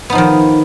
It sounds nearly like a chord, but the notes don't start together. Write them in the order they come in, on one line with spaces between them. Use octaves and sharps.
B3 D#4 F3 D#3